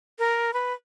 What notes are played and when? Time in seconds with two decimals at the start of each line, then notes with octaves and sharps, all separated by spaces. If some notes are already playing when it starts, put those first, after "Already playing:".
0.19 A#4
0.54 B4